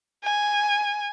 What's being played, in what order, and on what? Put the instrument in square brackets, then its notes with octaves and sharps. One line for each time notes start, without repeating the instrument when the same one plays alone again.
[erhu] G#5